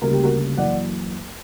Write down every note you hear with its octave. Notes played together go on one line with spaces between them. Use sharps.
D2 C#3 G3 A#3 A#4
G4
F#4 A#4
F#2 E3 A#3 D5 F#5